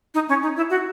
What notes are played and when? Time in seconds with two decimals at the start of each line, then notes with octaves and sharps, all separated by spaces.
0.14 D#4
0.29 C#4
0.43 D#4
0.56 E4
0.70 F#4